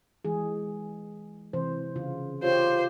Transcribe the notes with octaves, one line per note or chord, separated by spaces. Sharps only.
E3 G#3 G#4
C3 E3 C5
C#3 F4
F4 G4 C5 C#5